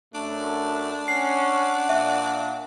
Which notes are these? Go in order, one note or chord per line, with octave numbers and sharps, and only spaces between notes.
F#2 A3 D4
C#4 F#5 C7
A#2 E5